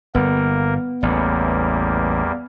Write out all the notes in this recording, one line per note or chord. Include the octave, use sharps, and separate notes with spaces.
G1 G3 A#3 B3 A#4
A1 E2 G3 A#3